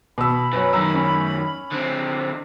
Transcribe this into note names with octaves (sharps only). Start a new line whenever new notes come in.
B2 B5 E6
F#2 B4 C#5
F#2 D#3 A#5 E6
C#4
D3 C4